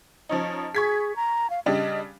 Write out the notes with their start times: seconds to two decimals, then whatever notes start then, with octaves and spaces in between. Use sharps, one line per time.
0.29 F3 C#4 D#4
0.75 G#4 C#6 G#6 B6
1.16 A#5
1.50 F5
1.66 C#3 G3 D4 D#5